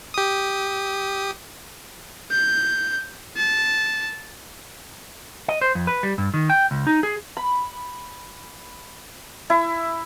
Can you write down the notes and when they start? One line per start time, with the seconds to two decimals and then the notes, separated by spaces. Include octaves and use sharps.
0.14 G4 D#6
2.31 G6
3.37 A5
5.48 D#5
5.61 C5
5.75 F2
5.87 B4
6.03 G3
6.18 G2
6.34 D#3
6.50 G5
6.71 C#2
6.87 D#4
7.03 G#4
7.37 B5
9.50 E4